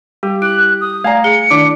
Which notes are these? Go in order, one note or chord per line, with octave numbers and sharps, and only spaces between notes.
G3 G4
E4 F#6
D#6
A3 D5 F5 G#5 A#5
G#4 C#7
D#3 D4 E4